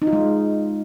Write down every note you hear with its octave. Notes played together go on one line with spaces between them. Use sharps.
D#4
F4
G#3